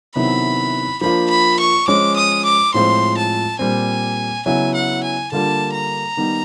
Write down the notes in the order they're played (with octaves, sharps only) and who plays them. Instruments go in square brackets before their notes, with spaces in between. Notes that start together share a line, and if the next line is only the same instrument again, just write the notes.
[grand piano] C3 D#3 F#3 B3 E4 [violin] B5
[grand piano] F3 A#3 D4 F4 [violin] B5
[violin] B5
C#6
[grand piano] F3 G#3 C#4 [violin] D6
[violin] D#6
D6
[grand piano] A2 F3 G#3 C4 F4 [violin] C6
[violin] A5
[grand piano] A#2 G3 C4 [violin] G#5
[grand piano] C#3 F#3 B3 E4 [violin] G#5
[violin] F#5
G#5
[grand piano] D3 G3 A#3 D4 F4 [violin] A5
[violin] A#5
[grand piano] D#3 G3 B3 D#4